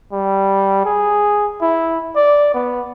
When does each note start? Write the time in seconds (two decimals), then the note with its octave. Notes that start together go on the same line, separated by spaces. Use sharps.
0.13 G3
0.86 G#4
1.62 E4
2.16 D5
2.54 B3